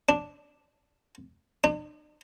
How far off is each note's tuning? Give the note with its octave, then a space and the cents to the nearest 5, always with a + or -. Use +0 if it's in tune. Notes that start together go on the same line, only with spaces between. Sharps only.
D4 +0
D4 +45